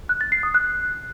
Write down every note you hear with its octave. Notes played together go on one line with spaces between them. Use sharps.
F#6
A6
C7
D#6
F#6